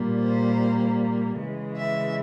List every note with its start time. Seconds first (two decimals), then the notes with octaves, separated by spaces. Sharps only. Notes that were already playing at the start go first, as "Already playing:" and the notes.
Already playing: A#2 G3 A#3
0.22 C5
1.38 C#3 E3 G#3
1.78 E5